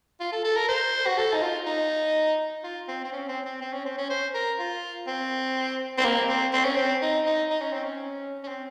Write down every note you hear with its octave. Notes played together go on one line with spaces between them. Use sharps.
F4
A4
A4
A#4
C5
F#4
A4
D#4
F4
D#4
F4
C4
C4
C#4
C4
C4
C4
C#4
C4
C#4
C5
A#4
F4
C4
C4
A#3
C4
C4
C#4
C4
D#4
D#4
D#4
C#4
C4
C#4
C#4
C4